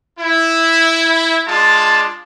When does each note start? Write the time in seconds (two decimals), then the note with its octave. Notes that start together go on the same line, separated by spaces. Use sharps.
0.18 E4
1.47 G#3 D4 F4 A5